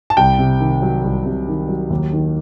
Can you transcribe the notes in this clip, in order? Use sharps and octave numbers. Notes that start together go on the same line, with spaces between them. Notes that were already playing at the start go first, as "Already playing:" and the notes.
A5
C2 G5
C3
D#3
F#3
C2
C3
D#3
F#3
D#2
D#3